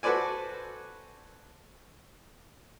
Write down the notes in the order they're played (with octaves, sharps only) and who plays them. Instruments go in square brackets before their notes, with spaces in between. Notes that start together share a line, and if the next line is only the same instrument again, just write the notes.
[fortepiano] F#4 A4 B4 C5 D5 G#5